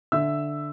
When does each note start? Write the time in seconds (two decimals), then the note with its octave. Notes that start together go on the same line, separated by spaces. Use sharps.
0.12 D3 E5 E6